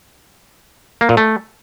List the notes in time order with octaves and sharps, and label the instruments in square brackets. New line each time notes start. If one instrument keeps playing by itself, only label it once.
[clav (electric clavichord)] A#3
A#2
A3